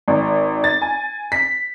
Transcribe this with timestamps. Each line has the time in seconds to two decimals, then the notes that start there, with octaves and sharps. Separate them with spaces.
0.08 G#1
0.64 A6
0.82 G#5
1.32 B6